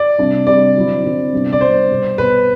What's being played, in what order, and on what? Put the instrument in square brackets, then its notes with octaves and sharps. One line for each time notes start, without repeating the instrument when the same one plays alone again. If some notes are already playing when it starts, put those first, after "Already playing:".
Already playing: [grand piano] D5
[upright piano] C3 G3 D4
[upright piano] C3 G3 D4 [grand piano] D5
[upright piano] D3 F#3 C4 E4
D3 F#3 C4 E4
C3 G3 B3 D4
[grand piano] D5
[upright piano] C3 G3 B3 D4 [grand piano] C5
[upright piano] B2 G3 B3
[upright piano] B2 G3 B3 [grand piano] B4